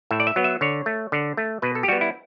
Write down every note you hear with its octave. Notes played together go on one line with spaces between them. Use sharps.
A2 E5
D5
E5
F#3 B3
E5
D3 C#5
A3
D3
A3
B2 B4
A4
G4
G3 B3 F#4
E4